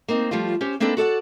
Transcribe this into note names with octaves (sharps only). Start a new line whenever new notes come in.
A#3 C4 D#4
F3 G3 A3 F4
C#4 G4 C5
A#3 C4 D4 D#4 A4 B4
F#4 A4 D5 F#5